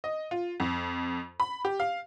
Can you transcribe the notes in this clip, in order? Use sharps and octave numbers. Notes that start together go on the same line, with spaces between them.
D#5
F4
F2
B5
G4
F5